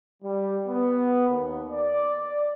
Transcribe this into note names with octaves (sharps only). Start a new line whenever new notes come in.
G3
B3
D#2
D5
D5